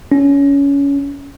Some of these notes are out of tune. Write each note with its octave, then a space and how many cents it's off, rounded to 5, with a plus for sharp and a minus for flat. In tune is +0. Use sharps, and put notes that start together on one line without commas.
C#4 +20